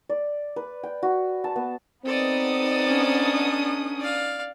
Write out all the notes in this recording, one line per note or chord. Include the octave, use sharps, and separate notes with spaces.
D5
B4
G5
F#4
A5
B3
B3 C4 D#4 A4 D5 D#6
C#4 D4
D5 F5